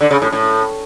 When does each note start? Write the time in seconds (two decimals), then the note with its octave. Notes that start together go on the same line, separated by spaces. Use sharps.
0.01 D3
0.11 C#3
0.22 A2
0.32 A2